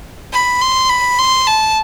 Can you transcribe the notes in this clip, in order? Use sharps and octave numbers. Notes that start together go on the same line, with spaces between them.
B5
C6
B5
C6
A5